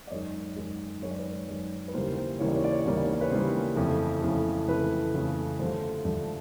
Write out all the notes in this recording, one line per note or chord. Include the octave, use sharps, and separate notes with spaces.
D5
F#2 D#3 G#3 C#5 D#5
F#2 D#3 G#3
F#2 D#3 G#3 C#5
D5
B4 C#5
F#2 D#3 G#3
B4
D#2 C#3 E3 G3 A#3 C5
C5
D#2 C#3 E3 G3 A#3 C#5
D5
C#5
D5
C#5
D5
D#2 C#3 E3 G3 A#3 C#5
D5
C#5
D5
B4 C#5
D#2 C#3 E3 G3 A#3 C5
F2 C#3 E3 A3
F2 C#3 E3 A3
F2 C#3 E3 A3 B4
F2 C#3 E3 A3
G2 D3 F3 A3 C5
G2 D3 F3 A3